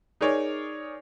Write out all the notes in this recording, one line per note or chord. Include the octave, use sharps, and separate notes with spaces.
D#4 G#4 A#4 C#5 D5